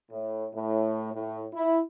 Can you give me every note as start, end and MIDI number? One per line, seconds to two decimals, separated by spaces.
0.10 0.46 45
0.54 1.10 45
1.13 1.45 45
1.53 1.78 64